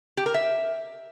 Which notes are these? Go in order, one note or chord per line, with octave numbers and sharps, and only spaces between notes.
G4
A#4
E5